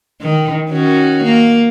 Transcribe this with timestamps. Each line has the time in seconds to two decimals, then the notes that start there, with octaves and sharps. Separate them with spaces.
0.21 D#3
0.70 D#3 C#4 F#4
1.24 A#3